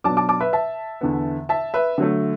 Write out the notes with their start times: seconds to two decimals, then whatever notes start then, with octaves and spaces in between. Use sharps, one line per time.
0.04 B2 F#3 D4 A5 D6
0.17 A5 D6
0.29 A5 D6
0.40 B4 E5
0.53 E5 A5
1.01 E2 D3 B3
1.49 E5 A5
1.74 B4 E5
1.98 D3 F#3 A3